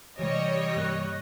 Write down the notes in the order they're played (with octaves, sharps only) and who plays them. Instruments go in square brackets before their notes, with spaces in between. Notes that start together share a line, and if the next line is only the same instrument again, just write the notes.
[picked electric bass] C3 E3 [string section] G3 C#5 [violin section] D#5
[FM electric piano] G2 A#3 F#6